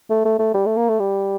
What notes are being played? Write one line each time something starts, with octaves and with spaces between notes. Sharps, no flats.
A3
A3
A3
G3
A3
A#3
A3
G3